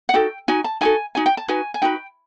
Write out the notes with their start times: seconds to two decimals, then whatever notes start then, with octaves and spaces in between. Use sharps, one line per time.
0.09 F#5
0.13 D#4 F#4 A4 G5
0.48 D#4 F#4 G#5
0.64 A5
0.81 D#4 F#4 A4 G#5
1.15 D#4 F#4 G#5
1.26 G5
1.37 A5
1.48 D#4 F#4 B4 G#5
1.74 G#5
1.82 D#4 F#4 B4 G5